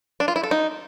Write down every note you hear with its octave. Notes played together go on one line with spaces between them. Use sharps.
D4
F4
E4
A4
D#4